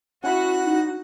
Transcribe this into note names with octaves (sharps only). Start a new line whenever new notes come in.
C#4 E4 F#4 F#5 B5
D#4